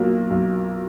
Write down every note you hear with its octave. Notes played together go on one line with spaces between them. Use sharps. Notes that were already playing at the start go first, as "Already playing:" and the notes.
Already playing: B1 A#2 F#3 A#3
B1